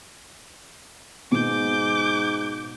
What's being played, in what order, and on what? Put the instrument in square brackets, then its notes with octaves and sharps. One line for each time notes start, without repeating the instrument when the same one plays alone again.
[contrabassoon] G#2 [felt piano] B2 [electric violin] D6 G6